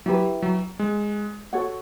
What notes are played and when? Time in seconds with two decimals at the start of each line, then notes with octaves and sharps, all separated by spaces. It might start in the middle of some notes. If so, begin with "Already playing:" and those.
0.06 F#3 E4 G4 B4
0.42 F#3
0.79 G#3
1.53 F#4 A4 C#5 F#5